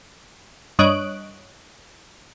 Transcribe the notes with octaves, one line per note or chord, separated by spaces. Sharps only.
G2 C#5 D#5 D#6 F#6 D7